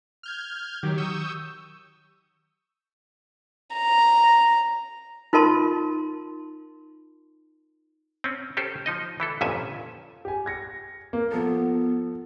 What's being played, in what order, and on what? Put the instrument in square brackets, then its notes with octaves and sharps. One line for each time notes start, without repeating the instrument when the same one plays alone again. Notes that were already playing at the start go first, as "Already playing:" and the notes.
[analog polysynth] F6 G6 G#6
D#3 F#3 G4
C#6 D#6 E6 G6
[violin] A#5
[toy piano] D#4 F4 A#4 A5 C6
[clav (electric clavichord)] C4 C#4
C#4 G4 A4 C5
F3 D#4 D#5
E3 E4 A4
G1 F2 A#2 C#4 E5 G#5
[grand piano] G4 G#5
G#6 A#6 C#7
A#3
[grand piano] F3 A4 [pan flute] B3